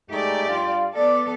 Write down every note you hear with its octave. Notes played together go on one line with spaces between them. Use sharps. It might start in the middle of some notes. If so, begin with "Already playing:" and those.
G#3 A3 D#4 G4 D5
G2 F4 F5
B3 A4 D5